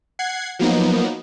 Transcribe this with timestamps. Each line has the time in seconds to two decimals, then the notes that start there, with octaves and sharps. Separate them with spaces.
0.19 F#5 G#6 C7
0.59 F3 F#3 A#3 B3 D#4